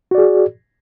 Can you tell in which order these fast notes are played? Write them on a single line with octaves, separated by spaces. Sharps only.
F#4 D5 G#4